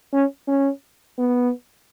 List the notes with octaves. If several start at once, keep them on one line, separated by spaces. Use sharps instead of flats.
C#4
C#4
B3